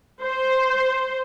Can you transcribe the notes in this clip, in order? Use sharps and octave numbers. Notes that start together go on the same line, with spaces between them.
C5